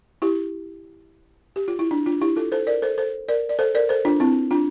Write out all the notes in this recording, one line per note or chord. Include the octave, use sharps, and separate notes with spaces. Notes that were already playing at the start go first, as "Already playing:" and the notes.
E4 G4
G4
F4
E4
D4
D4 F4
E4 G4
F4 A4
A4 C5
A#4 D5
A4 C5
A4 C5
A#4 D5
D5
A4 C5
A#4 D5
A4 C5
D4 F4
C4 E4
D4 F4